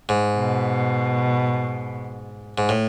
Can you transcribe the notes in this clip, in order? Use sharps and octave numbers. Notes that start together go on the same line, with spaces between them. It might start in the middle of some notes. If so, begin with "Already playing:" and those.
G#2
B2
G#2
A2